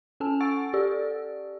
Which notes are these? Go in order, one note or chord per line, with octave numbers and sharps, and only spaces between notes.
C#4 A4 G#5 A5 E6
F#5 C#6 E6 A6 D7
G4 A4 D5 E6